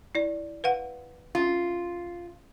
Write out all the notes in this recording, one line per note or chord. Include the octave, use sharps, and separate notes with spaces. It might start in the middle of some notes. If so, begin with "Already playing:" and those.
E4 D5
B4 F5 F#5
C#4 F4